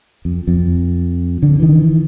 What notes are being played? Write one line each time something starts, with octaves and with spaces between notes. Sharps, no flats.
F2
F2
D3
D#3 E3